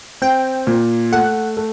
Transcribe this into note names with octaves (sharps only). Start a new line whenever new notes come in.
C4 G5
A#2
A3 F#5
A3